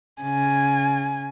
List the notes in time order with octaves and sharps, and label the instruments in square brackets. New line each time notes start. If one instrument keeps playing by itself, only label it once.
[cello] C#3 [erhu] G#5